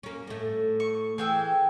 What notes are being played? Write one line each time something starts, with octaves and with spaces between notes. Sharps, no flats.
A#3 C#4
A2 A3
C#6
E3 G#4 G5 E6